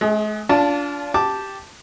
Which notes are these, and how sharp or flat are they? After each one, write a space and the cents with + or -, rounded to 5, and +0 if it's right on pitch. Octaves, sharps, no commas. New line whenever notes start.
G#3 +45 G#4 +0
D4 -30 F4 +0 A5 +0
G4 +0 A5 +0 D6 +0